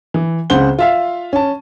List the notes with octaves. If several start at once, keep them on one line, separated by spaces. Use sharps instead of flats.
E3
C#2 C#3 C4 C5 F#5 G7
F4 E5 F5
C#4 A5